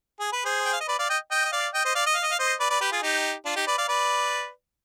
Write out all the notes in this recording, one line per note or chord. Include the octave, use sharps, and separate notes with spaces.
G#4
B4
G#4 C5
G5
F5
D#5
B4 D5
D5 F5
D#5 G5
D#5 G5
D#5
D5 F5
D#5 G5
C5 D#5
D5 F5
D#5
F5
D#5
F5
C5 D#5
B4 D5
B4 D5
G4 B4
F4 G#4
D#4 G4
D4 F4
D#4 G4
B4 D5
D5 F5
B4 D5